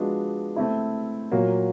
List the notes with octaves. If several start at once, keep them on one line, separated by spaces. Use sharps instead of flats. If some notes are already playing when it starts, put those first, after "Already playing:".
Already playing: F3 G#3 B3 D4 F#4
A3 C4 E4
A#2 F#3 A#3